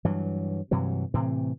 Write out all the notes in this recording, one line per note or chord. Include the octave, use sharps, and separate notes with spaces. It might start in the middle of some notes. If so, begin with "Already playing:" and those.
G2 E3 F#3
G2 C3 E3 F#3
A2 C3 E3 C4